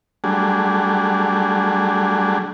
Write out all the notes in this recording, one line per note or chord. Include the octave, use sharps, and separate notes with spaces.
F#3 G3 A3 D4 G#4